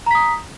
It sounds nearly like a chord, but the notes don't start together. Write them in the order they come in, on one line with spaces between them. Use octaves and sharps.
A#5 B6 D#6